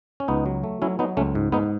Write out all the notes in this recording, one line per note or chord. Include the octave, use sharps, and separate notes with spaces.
C#4
C#2 B3 D#4
F#3
A3
F#3 C#4 E4
F#3 B3 D#4
C#2 A3 C#4
G#2
G#2 B3 D#4